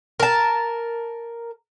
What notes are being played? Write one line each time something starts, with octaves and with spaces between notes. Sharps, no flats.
A#4 A5